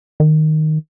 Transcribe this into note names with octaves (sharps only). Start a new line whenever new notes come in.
D#3